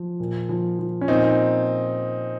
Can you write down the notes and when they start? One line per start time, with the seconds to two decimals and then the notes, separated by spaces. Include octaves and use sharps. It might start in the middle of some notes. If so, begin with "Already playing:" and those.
Already playing: F3
0.20 A#2
0.49 F3
0.79 F3
1.01 C#4
1.08 A#2 C4 D#4